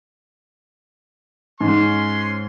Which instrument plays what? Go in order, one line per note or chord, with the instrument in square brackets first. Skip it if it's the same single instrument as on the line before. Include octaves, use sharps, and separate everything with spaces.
[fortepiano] G#2 [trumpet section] C#4 C6